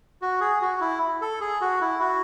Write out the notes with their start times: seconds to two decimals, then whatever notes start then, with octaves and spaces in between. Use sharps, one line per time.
0.22 F#4
0.41 G#4
0.62 F#4
0.81 E4
1.21 A4
1.41 G#4
1.61 F#4
1.81 E4
2.00 F#4